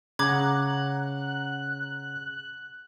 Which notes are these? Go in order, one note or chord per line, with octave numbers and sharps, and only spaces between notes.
C#3 F#5 A#5 D6 F#6 G#6